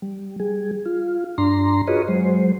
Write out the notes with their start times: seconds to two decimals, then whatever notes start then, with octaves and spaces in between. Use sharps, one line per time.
0.02 G3
0.40 G3 G#4
0.86 F4
1.38 G2 D4 A#5 C6
1.87 F4 F#4 G#4 B4 C#5 D#5
2.08 F#3 G#3 C5